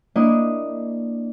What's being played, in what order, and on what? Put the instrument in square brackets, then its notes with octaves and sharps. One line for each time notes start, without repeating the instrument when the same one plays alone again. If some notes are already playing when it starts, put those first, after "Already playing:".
[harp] A#3 D4 E4 D#5